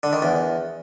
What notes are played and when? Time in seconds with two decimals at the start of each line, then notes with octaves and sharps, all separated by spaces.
0.03 D3
0.13 D#3
0.22 E2